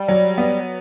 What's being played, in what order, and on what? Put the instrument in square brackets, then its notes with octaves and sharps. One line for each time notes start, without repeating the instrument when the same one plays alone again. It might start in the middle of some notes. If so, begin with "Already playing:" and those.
Already playing: [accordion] G3
[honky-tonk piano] F#3
B3